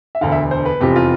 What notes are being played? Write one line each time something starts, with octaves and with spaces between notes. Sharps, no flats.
E5
E1 D2 D3 F5
E5
C5
B4
F1 E2 C3 F3 C4 G4
F4